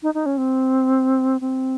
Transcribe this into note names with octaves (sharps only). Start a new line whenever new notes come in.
D#4
D#4
C#4
C4
C4